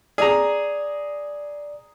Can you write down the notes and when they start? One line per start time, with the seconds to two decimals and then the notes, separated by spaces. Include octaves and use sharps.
0.18 G#4 D5 A#5